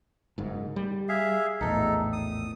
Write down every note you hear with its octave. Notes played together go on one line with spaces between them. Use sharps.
F#1 G#2
G3
G#4 E5 F5
A#1 E2 A2 D#4 A4
D#6